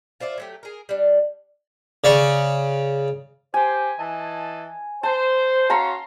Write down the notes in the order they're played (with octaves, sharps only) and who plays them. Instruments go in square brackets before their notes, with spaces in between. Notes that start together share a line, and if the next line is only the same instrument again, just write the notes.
[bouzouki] F4 C5 D5 E5
F#3 A3 G4
G#4 A#4
G3 D4
[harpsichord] C#3 D5 C#6
[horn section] G4 C5 [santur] G#5
[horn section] E3 D#5 A5
[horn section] C5 [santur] A5
[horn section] C#4 F#4 F5 [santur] A5 A#5 C6